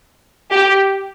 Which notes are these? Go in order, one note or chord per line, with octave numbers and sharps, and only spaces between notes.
G4